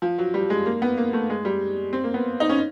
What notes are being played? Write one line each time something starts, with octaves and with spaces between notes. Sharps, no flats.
F3
F#3
G3
G#3
A#3
B3
A#3
A3
G#3
G3
C4
A#3
B3
D#4
C#4